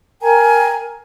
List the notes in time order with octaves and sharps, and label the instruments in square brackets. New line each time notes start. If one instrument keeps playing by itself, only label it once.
[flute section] A#4 G5 G#5 A#5